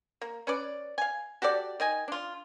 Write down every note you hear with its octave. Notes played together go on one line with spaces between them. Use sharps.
A#3
C#4 B4 D5
F5 G#5
F#4 G4 A4 D5
D#3 D#5 G#5
D4 F4